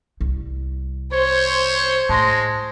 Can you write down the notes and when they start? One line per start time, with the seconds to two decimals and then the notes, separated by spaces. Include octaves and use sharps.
0.21 C2
1.13 C5 C#5
2.09 A2 G#3 A5 C6 A#6